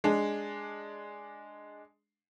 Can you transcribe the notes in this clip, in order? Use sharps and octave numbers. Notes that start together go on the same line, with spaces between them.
G#3 D4